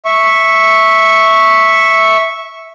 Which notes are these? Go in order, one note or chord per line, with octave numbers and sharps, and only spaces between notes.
E5 C#6